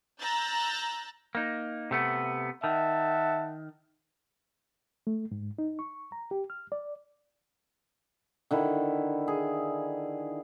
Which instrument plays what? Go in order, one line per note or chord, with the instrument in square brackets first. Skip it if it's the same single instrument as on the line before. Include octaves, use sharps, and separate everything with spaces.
[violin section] A#5 E6 F#6 G6 A6
[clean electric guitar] A#3 D#4
C3 A3 B3
[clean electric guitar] D#3 [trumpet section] E5 F#5 A5
[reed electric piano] A3
G#2
D#4
C#6
A#5
G4
F6
D5
[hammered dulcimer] D3 D#3 E4
G#4